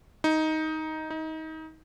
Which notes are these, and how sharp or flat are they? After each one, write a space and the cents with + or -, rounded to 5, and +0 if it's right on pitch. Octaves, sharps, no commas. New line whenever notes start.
D#4 +10
D#4 +25